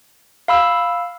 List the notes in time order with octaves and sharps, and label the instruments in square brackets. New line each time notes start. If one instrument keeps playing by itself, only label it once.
[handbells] F5 B5 E6